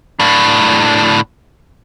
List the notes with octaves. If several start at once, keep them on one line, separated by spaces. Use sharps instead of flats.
A2 D4